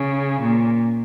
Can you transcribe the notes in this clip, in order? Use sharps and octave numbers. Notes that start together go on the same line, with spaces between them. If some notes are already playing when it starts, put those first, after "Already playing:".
Already playing: C#3
A#2